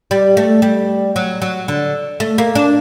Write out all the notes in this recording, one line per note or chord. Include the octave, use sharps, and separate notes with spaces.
G3
A3
G3
F#3
F#3
D3
A3
A#3
D4